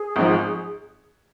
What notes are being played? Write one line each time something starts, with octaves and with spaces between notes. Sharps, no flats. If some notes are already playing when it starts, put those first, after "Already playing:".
Already playing: G#4
G#1 G#2 F3